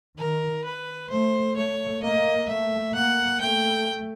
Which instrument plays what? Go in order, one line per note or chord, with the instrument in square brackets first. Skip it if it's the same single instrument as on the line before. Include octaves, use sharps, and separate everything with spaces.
[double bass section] D#3 [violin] A#4
[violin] B4
[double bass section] A3 [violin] C5
[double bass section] A3 [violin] C#5
[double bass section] A#3 [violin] D#5
[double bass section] A3 [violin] E5
[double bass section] A#3 [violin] F#5
[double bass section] A3 [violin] G5